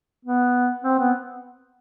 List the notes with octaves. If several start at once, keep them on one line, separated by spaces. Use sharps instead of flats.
B3
C4
B3